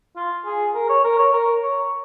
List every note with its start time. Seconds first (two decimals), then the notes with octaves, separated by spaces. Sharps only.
0.16 F4
0.46 G#4
0.75 A#4
0.89 C#5
1.04 A#4
1.19 C#5
1.33 A#4
1.62 C#5